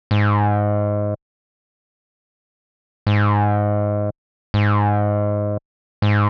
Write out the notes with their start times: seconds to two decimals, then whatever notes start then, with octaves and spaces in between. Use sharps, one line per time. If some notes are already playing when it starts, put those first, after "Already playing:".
0.11 G#2
3.07 G#2
4.54 G#2
6.02 G#2